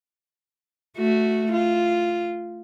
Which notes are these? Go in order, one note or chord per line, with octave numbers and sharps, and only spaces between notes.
A3 F#4
F4